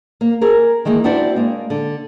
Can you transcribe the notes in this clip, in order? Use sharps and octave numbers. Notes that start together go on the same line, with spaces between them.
A#3
G#4 A#4
D#3 E3 G#3 A#3
C4 D4 E4 F#4 C5 D5
G#3 A#3
D3